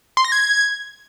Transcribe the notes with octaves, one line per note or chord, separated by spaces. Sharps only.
C6
A#6
G#6